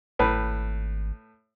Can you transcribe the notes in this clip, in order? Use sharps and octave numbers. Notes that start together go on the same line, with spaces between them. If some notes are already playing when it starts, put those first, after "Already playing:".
G#1 A2 B4